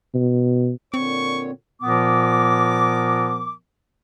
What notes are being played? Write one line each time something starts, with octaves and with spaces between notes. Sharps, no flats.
B2
A#2 D3 C4 C#5 C#6
A#2 F3 B3 A#4 D6